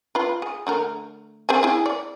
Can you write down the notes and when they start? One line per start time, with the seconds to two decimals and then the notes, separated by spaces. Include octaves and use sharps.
0.15 F4 B4
0.42 G#4
0.67 D3 A3 A#4
1.49 C4 G#4 G#5
1.63 E4 G#4
1.86 D5